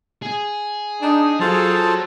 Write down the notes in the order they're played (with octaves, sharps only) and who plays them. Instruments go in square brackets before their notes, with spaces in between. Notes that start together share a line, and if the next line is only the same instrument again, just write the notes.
[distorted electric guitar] G#4
[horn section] D4 D#4
[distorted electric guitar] F#3 [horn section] F4 G#4 [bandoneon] A4 C5 A5